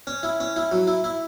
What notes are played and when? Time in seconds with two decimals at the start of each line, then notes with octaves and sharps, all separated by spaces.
0.07 C#4
0.23 E4
0.40 C#4
0.56 E4
0.72 F#3
0.87 E4
1.04 E4